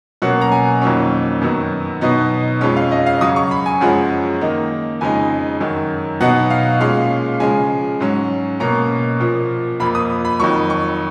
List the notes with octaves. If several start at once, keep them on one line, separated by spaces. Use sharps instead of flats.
B2 F#3 A#3 C#4 F#5
A#5
G#5
F2 D#3 F#3 A#3 C#4
F#2 D#3 F#3 B3
B2 F#3 B3 D#4
F2 F3 G#3 C#4
F5
D#5
F5
C#3 F#3 C#4 D#6
C#6
B5
G#5
F#2 F3 G#3 C#4 F#5
D#3 A#3 D#4
F2 C#3 G#3 D#4 G#5
F#2 D#3 F#3
B2 F#3 B3 D#4 F#5
F5
A#2 G#3 C#4 F5
C#3 F3 G#3 G#5
G#2 F#3 C#4
B2 A#3 C#4 A#5
A#2 F3 A#3
F2 F3 A#3 B5
D#6
B5
F2 D#3 F#3 C#6
C#6